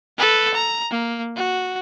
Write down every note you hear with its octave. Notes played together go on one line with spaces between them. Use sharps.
A4 B4
A#5
A#3
F#4